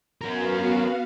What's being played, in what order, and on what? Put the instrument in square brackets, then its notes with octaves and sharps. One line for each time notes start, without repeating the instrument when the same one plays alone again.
[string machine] B3 F#4 F5 [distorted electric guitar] C#4 A#4